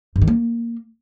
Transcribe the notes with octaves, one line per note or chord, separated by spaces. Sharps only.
G2
D#3
A#3